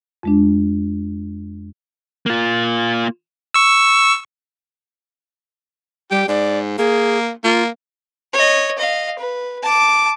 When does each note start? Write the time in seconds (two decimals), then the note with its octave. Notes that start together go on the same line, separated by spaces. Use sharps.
0.23 F2 G#3 D4
2.26 A#3 F4
3.54 C#6 E6
6.11 G3 G4
6.28 G#2 D5
6.78 A#3 G#4
7.44 A#3 F4
8.34 C#5 D#5
8.78 D#5 F5
9.19 B4
9.63 A5 D6